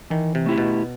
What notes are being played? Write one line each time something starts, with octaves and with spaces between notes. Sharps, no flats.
D#3 E3
C3
A3 E4 G4
B2